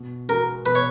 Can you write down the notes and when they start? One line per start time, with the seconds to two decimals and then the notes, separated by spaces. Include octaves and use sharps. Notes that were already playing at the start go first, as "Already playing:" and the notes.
Already playing: B2
0.29 G#3 B3 F#4 A#4
0.66 B2 B4
0.75 C#5